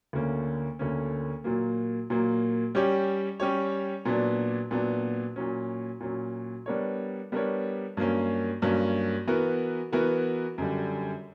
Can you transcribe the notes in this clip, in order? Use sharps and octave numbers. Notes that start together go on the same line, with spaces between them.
D2 D3 A#3 C#4
D2 D3 A#3 C#4
A#2 F#3 A#3
A#2 F#3 A#3
G3 C#4 G4 C#5
G3 C#4 G4 C#5
A#2 F#3 B3 D4
A#2 F#3 B3 D4
A#2 F#3 C#4
A#2 F#3 C#4
G3 B3 D4 A#4 C#5
G3 B3 D4 A#4 C#5
G2 F#3 A#3 C#4
G2 F#3 A#3 C#4
E3 B3 F#4 A#4
E3 B3 F#4 A#4
F#2 D3 G3